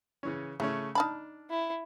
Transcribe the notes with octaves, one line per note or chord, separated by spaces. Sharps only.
C#3 E3 C#4
C#3 A3 C#4 E4
D4 D#4 A5 B5 F6
E4